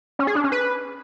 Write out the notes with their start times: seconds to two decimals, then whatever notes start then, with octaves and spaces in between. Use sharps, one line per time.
0.19 C#4
0.27 G#4
0.35 D4
0.44 C#4
0.52 B4